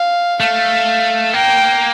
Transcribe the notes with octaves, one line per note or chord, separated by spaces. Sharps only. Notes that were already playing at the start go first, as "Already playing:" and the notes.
Already playing: F5
A3 F5
A#3 G5